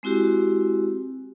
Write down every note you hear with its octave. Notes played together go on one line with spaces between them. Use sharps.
G#3 C4 E4 F#4 G4